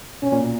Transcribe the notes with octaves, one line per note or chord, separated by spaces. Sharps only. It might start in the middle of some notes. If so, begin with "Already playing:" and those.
B2 C#4
A#2
B2